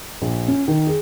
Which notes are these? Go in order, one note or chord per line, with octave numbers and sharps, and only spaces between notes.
A#1
C#4
D#3
G#4